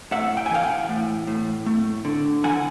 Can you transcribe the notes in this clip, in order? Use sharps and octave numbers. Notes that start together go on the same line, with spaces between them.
A2 E5 F#5
G5
G#5
E3 F5 G5
F#5 G#5
A2
A2
A3
D3
E3 F#5 G#5